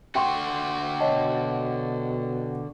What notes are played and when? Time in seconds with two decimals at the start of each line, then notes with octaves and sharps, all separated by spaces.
0.15 D3 F#4 G5 C6 C#6
1.00 B2 C#5 D#5 A5